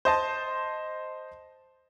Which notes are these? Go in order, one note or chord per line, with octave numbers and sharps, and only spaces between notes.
C5 D#5 A5